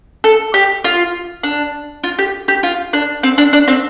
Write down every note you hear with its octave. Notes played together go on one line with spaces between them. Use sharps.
A4
G4
F4
D4
F4
G4
G4
F4
D4
C4
D4
D4
C4